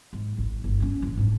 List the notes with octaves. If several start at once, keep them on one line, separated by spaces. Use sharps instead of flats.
G#2
G#1 A2
G1
A#3 C#4
A#2 E3
G#2 D4